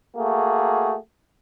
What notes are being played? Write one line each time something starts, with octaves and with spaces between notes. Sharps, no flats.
A3 A#3 F#4 G#4